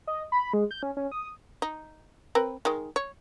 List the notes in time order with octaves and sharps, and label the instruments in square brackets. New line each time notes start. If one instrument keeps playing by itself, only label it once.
[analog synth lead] D#5
B5
G#3
G6
C#4
C#4
D#6
[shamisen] D#4
C4 A#4 B4
D#3 G#3
C#5